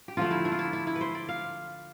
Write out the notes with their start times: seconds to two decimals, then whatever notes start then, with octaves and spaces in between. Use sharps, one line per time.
0.08 G4
0.17 D3 F3 A3 F4
0.31 E4
0.45 D4
0.52 F4
0.59 E4
0.73 E4
0.87 E4
0.95 B4
1.01 C5
1.15 D5
1.29 F5